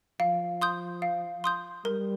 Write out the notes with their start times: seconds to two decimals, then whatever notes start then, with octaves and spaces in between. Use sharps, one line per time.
0.20 F3 F5
0.62 C6 D#6 G6
1.02 F5
1.44 C6 D#6 G6
1.85 G3 A#4